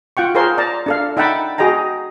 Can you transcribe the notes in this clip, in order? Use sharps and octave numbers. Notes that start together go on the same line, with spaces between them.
F4 F#5 G5 C#6
F4 G#4 A#4 C5 C#5 C6
D5 A5 A#5
D4 A4 F5
D#4 E5 F#5 G5 A5 B5
F#4 G#4 D#5 G5 A#5